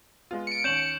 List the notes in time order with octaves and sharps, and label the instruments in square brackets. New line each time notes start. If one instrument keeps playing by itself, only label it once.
[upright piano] G#3 B3 F4
[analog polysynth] C#7 D7
[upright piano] D#2 C#4 [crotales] G6 E7 F#7